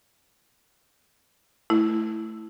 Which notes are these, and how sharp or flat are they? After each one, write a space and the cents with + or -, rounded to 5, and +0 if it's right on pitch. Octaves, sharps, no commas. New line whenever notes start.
A3 +0 E4 +0